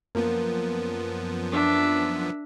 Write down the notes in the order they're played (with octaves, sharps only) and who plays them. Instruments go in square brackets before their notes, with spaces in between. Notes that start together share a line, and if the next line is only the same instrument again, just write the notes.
[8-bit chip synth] F#2 F3 B3 [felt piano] A#3
[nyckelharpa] D4 E5